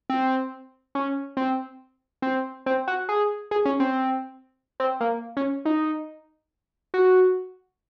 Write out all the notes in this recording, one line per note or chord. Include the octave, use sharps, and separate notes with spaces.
C4
C#4
C4
C4
C4
F#4
G#4
G#4
C#4
C4
C4
A#3
C#4
D#4
F#4